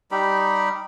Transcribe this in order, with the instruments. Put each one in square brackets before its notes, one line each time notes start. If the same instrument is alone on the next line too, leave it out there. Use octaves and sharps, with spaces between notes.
[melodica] G3 D#4 G4 B5